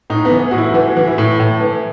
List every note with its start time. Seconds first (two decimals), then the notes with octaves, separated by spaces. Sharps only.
0.10 A2 D#4
0.25 B3
0.31 E3
0.51 A2 F#4
0.58 E4
0.74 E3 F#4
0.97 E3
1.07 E4
1.18 A2
1.40 A2
1.60 E3